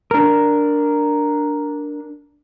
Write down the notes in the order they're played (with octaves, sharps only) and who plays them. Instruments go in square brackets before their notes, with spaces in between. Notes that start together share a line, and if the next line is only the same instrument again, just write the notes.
[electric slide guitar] D4 A#4